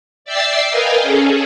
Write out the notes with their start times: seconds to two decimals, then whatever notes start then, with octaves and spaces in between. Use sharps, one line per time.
0.25 D5 E5 G5 E6 A6 C7
0.70 A#4 B4 D#5 F5 G5 G#5
1.02 C#4 G#4 A4